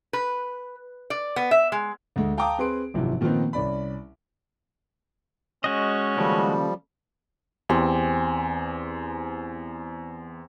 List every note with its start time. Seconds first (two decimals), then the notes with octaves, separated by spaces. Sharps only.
0.13 B4
1.10 D5
1.36 B3
1.51 E5
1.72 G#3
2.16 D2 G#3
2.38 F5 G5 A5 A#5 D6 D#6
2.58 C4 G#4 B4 C6 D7
2.94 G#1 F#2 C3 E3 F3
3.21 A#2 D#3 F3 B3 C4 D#4
3.53 C2 C#4 D5 B5
5.64 G#3 C#4 F#4 D#5
6.17 D#2 C#3 F3 G3 A4
7.69 E2 C4 G4 G#5